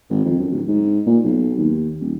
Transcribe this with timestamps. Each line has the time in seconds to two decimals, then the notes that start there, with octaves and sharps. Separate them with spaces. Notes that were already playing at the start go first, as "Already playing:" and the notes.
0.10 G#1
0.25 F2
0.39 F#2
0.52 D1
0.68 G#2
1.07 A#2
1.24 B1
1.58 D#2
2.00 D#1